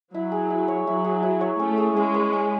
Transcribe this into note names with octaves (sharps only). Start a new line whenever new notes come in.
F#3 E4
G#4
E4
C#5
F#3 E4
G#4
E4
C#5
A3 C#4
G#4
G#3 C#4
B4
C#4